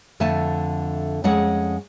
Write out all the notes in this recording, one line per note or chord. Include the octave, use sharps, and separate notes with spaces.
F2 D3 A3 E5 G#5 A5
F2 G#3 C#4 G#4 F#5